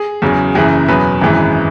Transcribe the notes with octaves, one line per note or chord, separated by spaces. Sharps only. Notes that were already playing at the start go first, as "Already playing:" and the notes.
Already playing: G#4
E2 C#3 F#3
F#1 F#2 E3 G#4
E2 B2 F#3 B4
G#1 F#2 E3 G#3